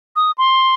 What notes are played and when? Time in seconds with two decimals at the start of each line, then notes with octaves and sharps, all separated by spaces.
0.16 D#6
0.38 C6